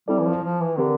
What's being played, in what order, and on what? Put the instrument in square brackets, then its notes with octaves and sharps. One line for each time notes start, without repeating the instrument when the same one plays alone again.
[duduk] G3 [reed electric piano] C4 E4 A4 D5
[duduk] E3
F3
F3
E3
[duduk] D3 [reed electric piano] C4 G4 A#4